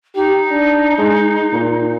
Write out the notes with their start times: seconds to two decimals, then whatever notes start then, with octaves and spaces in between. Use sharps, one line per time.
0.15 D#4 G4
0.51 D4
0.98 G#3
1.53 A#2